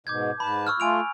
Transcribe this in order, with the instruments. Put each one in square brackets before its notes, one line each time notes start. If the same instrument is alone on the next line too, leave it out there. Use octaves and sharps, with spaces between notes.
[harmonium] G#2 B2 [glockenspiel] D6 G6 G#6
[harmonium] G#2 B4 A5 [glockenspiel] B5
[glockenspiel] C#6 E6 F6
[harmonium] A3 F4 [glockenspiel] G#5 D7 F7